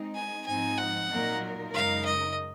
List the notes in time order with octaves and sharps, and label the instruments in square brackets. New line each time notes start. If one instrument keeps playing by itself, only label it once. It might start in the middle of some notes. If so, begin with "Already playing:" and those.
Already playing: [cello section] G#3 C4 D#4
[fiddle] G#5
[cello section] G#2 F3 C4 D#4 [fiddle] G#5
[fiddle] F#5
[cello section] A#2 F#3 A#3 D#4 A#4
[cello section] F#2 C#3 G#3 D#4 A#4 [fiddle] F5
[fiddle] D#5